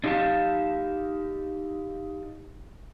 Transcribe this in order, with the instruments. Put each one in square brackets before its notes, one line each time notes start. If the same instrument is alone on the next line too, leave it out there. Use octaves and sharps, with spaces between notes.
[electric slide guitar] D4 D#4 G4 D#5 F5 A5